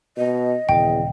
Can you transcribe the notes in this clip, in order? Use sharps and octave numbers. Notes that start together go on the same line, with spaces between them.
B2 D#5
D#1 E2 C#3 G5